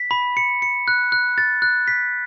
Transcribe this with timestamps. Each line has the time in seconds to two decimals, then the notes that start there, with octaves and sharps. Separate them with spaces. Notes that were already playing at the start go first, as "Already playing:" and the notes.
Already playing: B6
0.11 B5
0.37 C#7
0.62 C#7
0.88 F#6
1.12 F#6
1.38 A6
1.62 F#6
1.88 B6